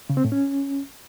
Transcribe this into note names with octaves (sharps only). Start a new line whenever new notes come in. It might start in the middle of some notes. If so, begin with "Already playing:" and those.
C#3
C4
A2
C#4